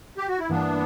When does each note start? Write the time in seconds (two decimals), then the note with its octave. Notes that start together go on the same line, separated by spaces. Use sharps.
0.18 G4
0.28 F#4
0.39 E4
0.49 G2 E3 A#3 B3 D4